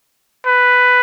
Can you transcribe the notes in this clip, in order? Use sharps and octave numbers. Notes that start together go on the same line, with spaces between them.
B4